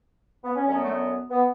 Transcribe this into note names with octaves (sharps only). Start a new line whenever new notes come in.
B3
C#4
F#2 D3 F#3 C#4
B3
A3
B3
B3